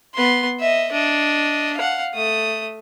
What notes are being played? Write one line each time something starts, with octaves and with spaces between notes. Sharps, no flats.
B3 C6
D#5 E5
D4 D#5
F5 F#5
A3 D#6